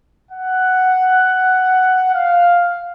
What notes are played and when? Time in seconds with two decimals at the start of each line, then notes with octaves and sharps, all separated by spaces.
0.31 F#5
2.14 F5